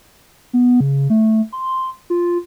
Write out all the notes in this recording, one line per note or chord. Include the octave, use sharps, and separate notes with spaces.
B3
C#3
A3
C6
F4